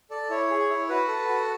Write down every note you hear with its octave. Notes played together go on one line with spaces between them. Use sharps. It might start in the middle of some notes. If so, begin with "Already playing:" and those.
A4 D5
E4 C#5
G#4
E4
F#4 B4
A4
F#4